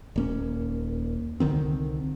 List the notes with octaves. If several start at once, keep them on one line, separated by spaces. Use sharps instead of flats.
D#1 A#3 C#4
C2 D3 D#3 C4